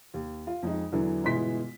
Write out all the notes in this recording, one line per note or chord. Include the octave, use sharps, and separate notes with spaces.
D#2
F4
F2 G#3 D#4
E2 D3 E3 F#3
G1 B2 E3 G#3 C6 B6